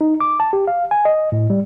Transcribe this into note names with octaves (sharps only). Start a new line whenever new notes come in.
D#4
D6
A5
G4
F5
G#5
D#5
A2
G3